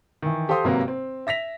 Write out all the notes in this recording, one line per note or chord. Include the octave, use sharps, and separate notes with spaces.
D#3 E3
G4 A4 C5 F5 C6 D#6
G#1 C3 F#3 A#3 B4
C4
E5 A#6 B6 F7